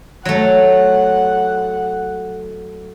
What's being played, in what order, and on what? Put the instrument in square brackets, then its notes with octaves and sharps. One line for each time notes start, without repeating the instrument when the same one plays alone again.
[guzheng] F#3 A3 [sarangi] F#5